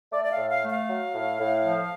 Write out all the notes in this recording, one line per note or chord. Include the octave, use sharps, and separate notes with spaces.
A3 D5
D5
F5
A2
F5
A3
F5
F#3
A2
A2
F3